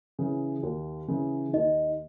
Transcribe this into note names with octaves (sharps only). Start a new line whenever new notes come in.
C#3 E3
D#2
C#3 E3
D#2 D#4 D#5